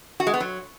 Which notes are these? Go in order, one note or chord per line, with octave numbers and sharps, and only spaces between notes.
F#4
G#3
B3
F#3